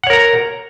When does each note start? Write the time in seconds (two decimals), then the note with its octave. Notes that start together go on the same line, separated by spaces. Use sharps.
0.04 F#5
0.07 C#5
0.10 A#4
0.13 A#5